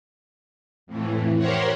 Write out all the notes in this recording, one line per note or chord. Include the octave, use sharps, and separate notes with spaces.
F2 A2 E3
G4 A#4 C5 C#5 F#5